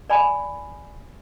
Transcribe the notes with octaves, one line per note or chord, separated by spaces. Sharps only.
D5 G#5 B5